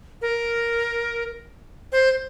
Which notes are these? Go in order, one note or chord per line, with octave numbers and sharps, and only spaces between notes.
A#4
C5